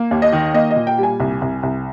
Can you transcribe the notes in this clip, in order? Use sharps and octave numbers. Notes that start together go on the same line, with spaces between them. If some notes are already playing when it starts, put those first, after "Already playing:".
Already playing: A#3
D#2
D#5
D#3
A#3 D#5
D#5
A#2
G5
G3 G#5
C2
C2
C2